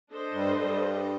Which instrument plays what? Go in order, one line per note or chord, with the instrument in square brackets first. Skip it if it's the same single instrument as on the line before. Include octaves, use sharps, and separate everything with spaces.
[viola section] D4 A4 C5 D#5
[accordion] G2 G3
G2 G3